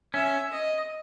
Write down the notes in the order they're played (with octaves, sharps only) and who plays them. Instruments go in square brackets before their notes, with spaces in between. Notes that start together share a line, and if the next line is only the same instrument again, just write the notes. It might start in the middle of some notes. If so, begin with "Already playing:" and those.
[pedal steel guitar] C#4 [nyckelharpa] E5
[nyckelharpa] D#5